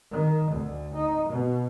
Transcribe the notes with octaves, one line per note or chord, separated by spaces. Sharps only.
D#3
D2
D#4
B2